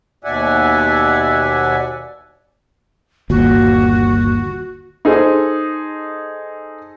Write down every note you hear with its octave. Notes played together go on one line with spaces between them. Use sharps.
D#2 B2 D5 E5 F#5 G#5
G1 D#2 A#2 F#4
D#4 G#4 A4 C5 D#5